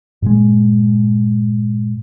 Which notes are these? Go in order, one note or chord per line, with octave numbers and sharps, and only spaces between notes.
G2 A#2 G#3